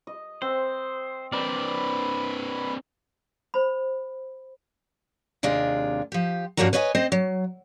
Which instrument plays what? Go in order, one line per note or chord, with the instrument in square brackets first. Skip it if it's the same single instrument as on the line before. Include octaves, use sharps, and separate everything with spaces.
[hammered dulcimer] D#5
[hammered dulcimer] C4 [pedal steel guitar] C5
[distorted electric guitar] C4 D4 [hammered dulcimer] A#4 [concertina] B4 B5 [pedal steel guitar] D5
[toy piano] C5 B5
[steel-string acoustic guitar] D#2 C3 G#3 D4 F4
F3 G4
G2 F3 A#3 C#4 F#4 A#5
B4 C#5 D#5 E5 G#5
C4 C5 D#5
F#3